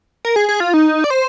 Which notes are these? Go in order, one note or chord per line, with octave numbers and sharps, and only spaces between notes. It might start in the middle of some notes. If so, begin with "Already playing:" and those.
A#4
G#4
G#4
F4
D#4
D5
C5